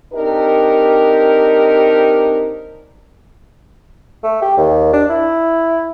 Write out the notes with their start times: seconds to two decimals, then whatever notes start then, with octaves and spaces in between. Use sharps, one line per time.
0.12 C4 D4 D#4 G4 A#4
4.23 A3
4.42 G4
4.57 D#2
4.93 D4
5.10 E4